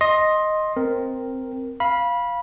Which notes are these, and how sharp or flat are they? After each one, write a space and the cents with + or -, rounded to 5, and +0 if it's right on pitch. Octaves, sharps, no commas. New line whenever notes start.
D#5 +0 C6 +10
C4 +0 A#4 +0
F5 +0 B5 -20